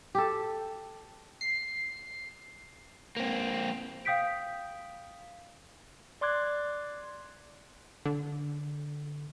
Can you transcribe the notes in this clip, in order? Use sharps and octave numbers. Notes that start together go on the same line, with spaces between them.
G4 A4
C7
A#3 C4
F5 G5 D#6 G6 B6 D7
D5 C6 D6 F#6 G#6
D3